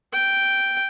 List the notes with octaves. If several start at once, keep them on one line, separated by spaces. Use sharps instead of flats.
G5